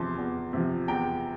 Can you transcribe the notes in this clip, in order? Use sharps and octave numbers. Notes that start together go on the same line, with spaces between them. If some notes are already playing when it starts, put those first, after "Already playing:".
Already playing: E2 C3 F3 A5 C6
E2
C3 F3
E2 G5 A#5